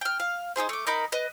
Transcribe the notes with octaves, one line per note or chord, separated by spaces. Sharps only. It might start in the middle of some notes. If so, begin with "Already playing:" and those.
G5 F6
F5
D#4 E4 G#4 C5
A3 D6
D#4 A#4 B5 G6
B4 D#5